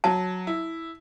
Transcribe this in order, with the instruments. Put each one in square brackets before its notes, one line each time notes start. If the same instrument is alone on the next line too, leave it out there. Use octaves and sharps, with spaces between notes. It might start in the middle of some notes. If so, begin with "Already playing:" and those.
[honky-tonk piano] F#3 [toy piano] A5
[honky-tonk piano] E4